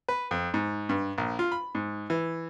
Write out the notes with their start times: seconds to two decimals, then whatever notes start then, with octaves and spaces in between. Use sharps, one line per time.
0.09 B4
0.31 F2
0.54 G#2
0.89 G2
1.18 A#1
1.39 F4
1.52 B5
1.75 G#2
2.10 E3